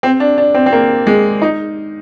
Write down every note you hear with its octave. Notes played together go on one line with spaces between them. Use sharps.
C4
D4
D4
C4
C4
A#3
G#3
D#4